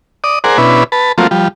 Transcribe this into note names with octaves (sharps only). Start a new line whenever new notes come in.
D5 D#6
G#4 A#4 C5 D5 F#5
B2 C#4 D4 E4 B4
B4 A5
F3 F#3 A3 A#3 C4 F4
F3 G3